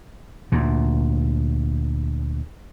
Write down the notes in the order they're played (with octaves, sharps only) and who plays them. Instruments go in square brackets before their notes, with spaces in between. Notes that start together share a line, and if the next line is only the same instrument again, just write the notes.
[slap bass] D2 A#2